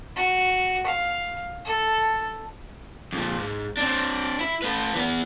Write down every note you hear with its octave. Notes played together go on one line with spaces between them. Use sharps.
F#4
F5
A4
F2 A#2
G#2
C4 D4
E4
A3 B4
E3 B3